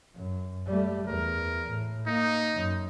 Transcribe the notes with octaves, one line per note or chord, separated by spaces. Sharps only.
F#2
G3 A3
E2 A#4
A2
A#3 D#4
F#2